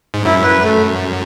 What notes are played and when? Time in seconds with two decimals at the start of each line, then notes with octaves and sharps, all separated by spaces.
0.14 G#2
0.25 F#2 E4
0.43 B4
0.62 A3